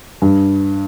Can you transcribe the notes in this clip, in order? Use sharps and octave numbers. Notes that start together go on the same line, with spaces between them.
G2